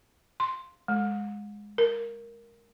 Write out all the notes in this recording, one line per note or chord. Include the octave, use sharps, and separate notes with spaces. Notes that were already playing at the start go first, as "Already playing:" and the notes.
C6
G#3
A#4